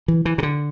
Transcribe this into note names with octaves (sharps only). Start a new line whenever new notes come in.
E3
E3
C3
D3